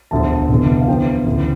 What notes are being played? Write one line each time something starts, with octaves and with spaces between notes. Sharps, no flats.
E1 D2 D3 F3 A5
F1 E2 D3
F5
E2 D3 F3 G5
D2 C#3 E3